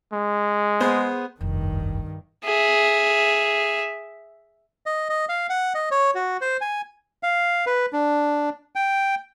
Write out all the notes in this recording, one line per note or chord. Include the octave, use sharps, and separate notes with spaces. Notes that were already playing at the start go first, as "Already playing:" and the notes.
G#3
B3 G#4 C5
F1 C2 G2 D#3
G#4 E5
D#5
D#5
F5
F#5
D#5
C#5
F#4
C5
G#5
F5
B4
D4
G5